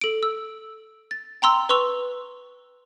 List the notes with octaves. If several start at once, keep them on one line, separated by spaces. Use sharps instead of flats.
A4 D7
E6
A6
G5 A#5 C6 E6
B4 C6 C#6 E6 F7